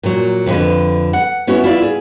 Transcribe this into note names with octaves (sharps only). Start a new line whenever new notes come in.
A#2 F#3
F2 D3 B4
F#5
B3 C#4 E4 F#4
E4 F4 D5 F5
G#4